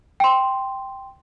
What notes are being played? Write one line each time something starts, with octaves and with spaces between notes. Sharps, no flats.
G5 C6